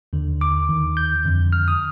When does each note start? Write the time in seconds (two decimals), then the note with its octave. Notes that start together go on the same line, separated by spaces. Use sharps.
0.13 D#2 D3
0.41 D6
0.69 D#2 D#3
0.97 G6
1.25 F2 D3
1.53 F6
1.68 D#6